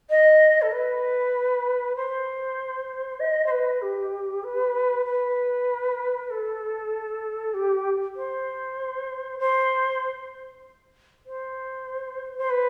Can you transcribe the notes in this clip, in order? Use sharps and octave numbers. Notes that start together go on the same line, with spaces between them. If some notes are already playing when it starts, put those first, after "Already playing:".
D#5
A4
B4
C5
D#5
C5
B4
G4
B4
B4
A4
G4
C5
C5
C5
C5
B4